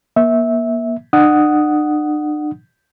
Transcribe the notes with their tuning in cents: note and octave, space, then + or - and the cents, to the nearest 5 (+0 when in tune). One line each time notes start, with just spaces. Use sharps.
A#3 +35 E5 -15
D4 +45 F#5 +0 D#6 +0